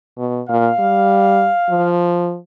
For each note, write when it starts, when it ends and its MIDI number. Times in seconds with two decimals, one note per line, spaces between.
0.18 0.41 47
0.49 0.70 46
0.49 1.88 77
0.79 1.50 55
1.70 2.37 53